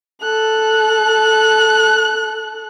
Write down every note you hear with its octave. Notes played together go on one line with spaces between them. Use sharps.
A4 F#6